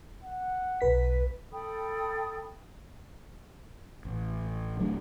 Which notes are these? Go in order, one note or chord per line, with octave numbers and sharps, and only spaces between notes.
F#5
B1 B4 B6
A4 G5 B5 D#6
A1
D#1 F#3 A3 D4